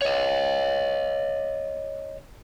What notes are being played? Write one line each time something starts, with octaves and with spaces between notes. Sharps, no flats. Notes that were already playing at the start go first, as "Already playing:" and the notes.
C#5 D#5